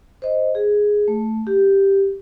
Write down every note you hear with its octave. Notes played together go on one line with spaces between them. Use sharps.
C5 D#5
G#4
A3
G4